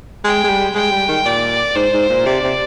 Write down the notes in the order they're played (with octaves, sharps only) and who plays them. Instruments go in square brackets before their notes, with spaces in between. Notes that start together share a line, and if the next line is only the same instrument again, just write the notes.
[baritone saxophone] G#3 [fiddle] G5
[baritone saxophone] G#3
G3
[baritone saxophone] G#3 [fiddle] G5
[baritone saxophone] G3
D#3
[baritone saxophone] A#2 [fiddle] D5
[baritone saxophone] G#2 [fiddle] C5
[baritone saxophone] G#2
A#2
[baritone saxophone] C3 [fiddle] D5
[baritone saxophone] C3